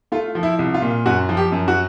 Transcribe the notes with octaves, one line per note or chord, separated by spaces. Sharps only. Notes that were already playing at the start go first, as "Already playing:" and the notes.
A3 F4
F3
E4
C2
F4
A#2
F#2 F#4
F3
G4
F#2
F#4